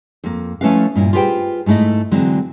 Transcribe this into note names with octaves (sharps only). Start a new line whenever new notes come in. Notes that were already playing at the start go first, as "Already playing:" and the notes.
F2 A#3
F3 A3 C#4 E4 B4 F5
G2 A#2 E4
F4 G4 G#4 B4 C5 G5
G#2 G3 A3 E4 D#5
D3 E3 F#3 G#3 C4